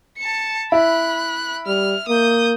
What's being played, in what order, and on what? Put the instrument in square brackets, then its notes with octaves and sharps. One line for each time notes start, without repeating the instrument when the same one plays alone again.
[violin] A5 C#7
[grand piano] E4 [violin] B5 F#6
[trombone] G3 [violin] F6
[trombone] A#3 [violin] D#6 G6